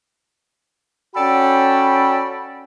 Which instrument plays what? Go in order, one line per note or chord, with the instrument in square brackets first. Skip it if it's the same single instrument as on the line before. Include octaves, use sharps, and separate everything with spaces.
[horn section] C#4 F#4 A4 D5 G5 B5